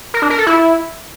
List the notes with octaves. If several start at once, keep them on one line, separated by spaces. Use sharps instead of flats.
A#4
D4
A#4
A4
E4